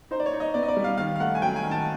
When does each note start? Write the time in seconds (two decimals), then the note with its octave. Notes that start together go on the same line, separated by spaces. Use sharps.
0.11 D#4 C5
0.20 D5
0.26 C#5
0.33 D#4
0.40 D#5
0.54 B3 D5
0.63 D#5
0.68 D5
0.77 G3
0.84 F5
0.98 D#3 F5
1.16 F5
1.20 A3 F#5
1.35 G#5
1.42 F#3 G5
1.56 G#5
1.63 D#3
1.71 A5